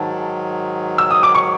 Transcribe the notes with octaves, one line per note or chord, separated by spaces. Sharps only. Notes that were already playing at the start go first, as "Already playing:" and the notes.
Already playing: G#2 D#3 F#3 A5
E6
D#6
D6
C#6